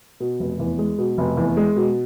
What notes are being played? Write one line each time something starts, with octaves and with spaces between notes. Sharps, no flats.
B2
F1
E2
G#3
B2
F1
E2
G#3
B2